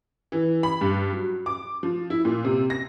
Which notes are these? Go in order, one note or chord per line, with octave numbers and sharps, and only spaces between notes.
E3
B5
G2
F#3
D6
F3
E4
A#2
C3
A#6